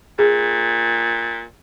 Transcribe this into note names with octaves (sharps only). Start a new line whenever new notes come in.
A#2 G#4